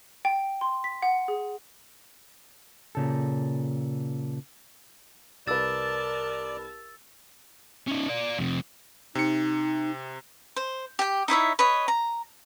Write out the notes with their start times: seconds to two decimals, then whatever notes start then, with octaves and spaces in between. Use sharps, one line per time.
0.25 G5
0.61 C6
0.84 B6
1.02 F#5
1.28 G#4
2.95 A#2 C#3 A4
5.47 C2 A#4 B4 D5 A5 E6 A6 E7
7.87 C#4 D#4
8.08 A#4 D5
8.39 F2 C3
9.15 C3 D#4 C#7
10.56 C5
10.99 G4 G5
11.28 D#4 E4 C#5 E5
11.59 B4 C#5 D#5
11.88 A#5